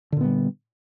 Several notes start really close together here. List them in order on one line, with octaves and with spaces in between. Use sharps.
D3 A#2 B3 G3